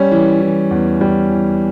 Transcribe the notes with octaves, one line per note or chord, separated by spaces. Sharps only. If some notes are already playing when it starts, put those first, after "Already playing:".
Already playing: G3 C#4
E3
E3
E2
G3
E3